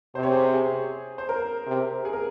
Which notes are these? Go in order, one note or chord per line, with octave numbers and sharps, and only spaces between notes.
C3 C5
C#5
G#4 C5
G#4
C5
A#4
C3
G#4
A#4